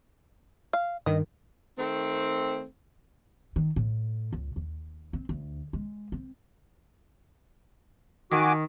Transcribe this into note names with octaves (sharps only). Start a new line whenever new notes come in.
F5
G2 D#3 D#5
D#3 A3 C4
D#3
A2
C#2
D#2
C4
D2
G#3
C4
D#3 F#4 G#5 D6